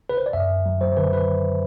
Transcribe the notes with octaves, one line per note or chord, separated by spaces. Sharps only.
B4
C5
D5
F#2 E5
F#2
F#3
F#3 C5
D3 B4
F#3 B4